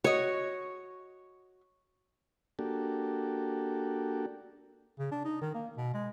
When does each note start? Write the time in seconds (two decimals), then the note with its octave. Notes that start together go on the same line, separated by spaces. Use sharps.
0.04 F#4 C#5 D#5
2.59 A#3 D4 F#4 G4 A4
4.99 C#3
5.11 D4
5.25 D#4
5.41 D#3
5.54 A#3
5.77 B2
5.94 G#3